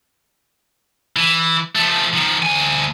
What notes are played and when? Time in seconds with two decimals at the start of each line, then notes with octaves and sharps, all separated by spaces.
1.16 E3
1.75 F3 A3
2.13 D#3 F3
2.43 D2 G#5